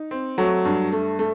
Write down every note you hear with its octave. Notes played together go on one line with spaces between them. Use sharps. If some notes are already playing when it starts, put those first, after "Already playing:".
Already playing: D#4
C4
F#3 A3
G2
A3
A3